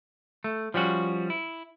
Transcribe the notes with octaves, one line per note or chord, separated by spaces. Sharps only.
A3
F3 G3 C#4 F#4
E4